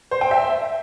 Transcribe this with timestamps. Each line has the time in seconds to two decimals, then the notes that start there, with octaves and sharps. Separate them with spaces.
0.11 C5
0.21 G5
0.31 E5